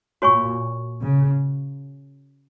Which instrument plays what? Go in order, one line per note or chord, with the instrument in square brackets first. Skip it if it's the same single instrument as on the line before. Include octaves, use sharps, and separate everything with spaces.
[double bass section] A#2 [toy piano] F#4 C#5 G#5 C#6
[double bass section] C#3